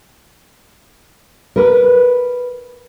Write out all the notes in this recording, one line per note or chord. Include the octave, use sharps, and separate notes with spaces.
A#4 B4